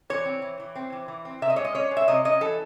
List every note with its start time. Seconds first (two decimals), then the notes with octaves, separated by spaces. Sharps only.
0.10 E3 C#5
0.25 C4
0.42 E3
0.60 E3
0.75 C4
0.92 E3
1.08 E3
1.25 C4
1.42 C3 E5
1.50 D#5
1.56 G#3 C#5
1.64 D#5
1.75 C#4 C#5
1.91 G#3
1.97 E5
2.08 C3 D#5
2.25 C#4 D#5
2.41 E3 A4